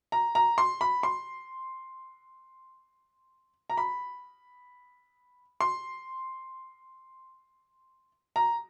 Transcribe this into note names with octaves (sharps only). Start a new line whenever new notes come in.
A#5
A#5
C6
B5
C6
A#5
B5
C6
A#5